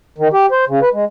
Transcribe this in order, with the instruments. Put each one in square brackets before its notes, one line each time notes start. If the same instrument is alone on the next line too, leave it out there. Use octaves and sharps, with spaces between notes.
[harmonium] D#3
G4
C5
C#3
B4
G#3